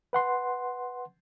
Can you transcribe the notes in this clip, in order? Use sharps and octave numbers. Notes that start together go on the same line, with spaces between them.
B4 F#5 C6